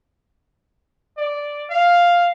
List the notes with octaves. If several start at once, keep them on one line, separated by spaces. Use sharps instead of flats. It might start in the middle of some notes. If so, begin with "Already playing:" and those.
D5
F5